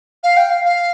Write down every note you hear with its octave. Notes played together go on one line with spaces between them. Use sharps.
F5
G5
F5
F5